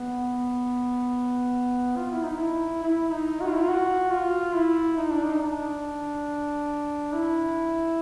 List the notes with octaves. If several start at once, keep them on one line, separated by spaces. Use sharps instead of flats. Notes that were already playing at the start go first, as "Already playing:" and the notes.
Already playing: B3
F4
E4
D#4
E4
E4
D#4
F#4
F4
E4
F4
F#4
F4
E4
D#4
D4
D#4
D4
E4